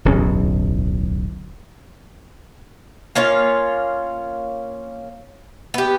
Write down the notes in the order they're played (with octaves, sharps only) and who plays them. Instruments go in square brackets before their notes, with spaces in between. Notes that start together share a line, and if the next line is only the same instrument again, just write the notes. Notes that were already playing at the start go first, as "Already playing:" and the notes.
[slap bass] D1 B1 E2 C#4
[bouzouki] A#3 C#4 F4 C#5
B3 G4